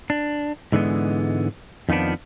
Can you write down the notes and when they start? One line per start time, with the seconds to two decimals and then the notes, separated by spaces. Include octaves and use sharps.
0.10 D4
0.72 G#2 D3 E3 G#3 B3
1.89 F2 D#3 F3 B3 D4